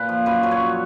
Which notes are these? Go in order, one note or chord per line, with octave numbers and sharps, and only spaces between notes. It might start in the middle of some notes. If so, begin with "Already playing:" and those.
Already playing: A#2 B4
F3
F#2 B4
F#3
C#5